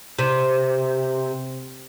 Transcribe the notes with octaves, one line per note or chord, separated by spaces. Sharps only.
C3